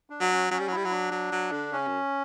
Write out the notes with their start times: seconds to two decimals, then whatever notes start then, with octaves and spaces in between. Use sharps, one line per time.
0.10 D4
0.20 F#3
0.31 C#4
0.51 F#3 C#4
0.59 G3
0.68 F#3 E4
0.77 G3
0.85 F#3
0.91 D4
1.11 F#3
1.32 F#3
1.52 D3
1.72 C#3 C#4
1.87 F#2